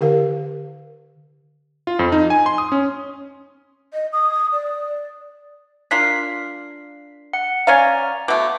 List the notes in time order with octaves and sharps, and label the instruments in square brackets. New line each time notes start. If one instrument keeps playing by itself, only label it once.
[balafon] D3 G4 A#4 F5
[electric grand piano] F4
F2
D#4
G#5
C6
D#6
C#4
[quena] D#5
D#6
D5
[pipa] D4 F4 A#4 [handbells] B6 C7
[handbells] F#5
[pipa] C#4 C#5 F5 [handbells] D5 A#5
[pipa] B2 A3 [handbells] D6